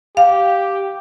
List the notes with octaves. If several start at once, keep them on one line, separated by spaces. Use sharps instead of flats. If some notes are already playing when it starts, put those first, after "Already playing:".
G4 F5